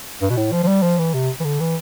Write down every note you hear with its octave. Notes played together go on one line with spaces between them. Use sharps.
G2
B2
A2
F3
F3
G3
F3
E3
C3
E3
D3
E3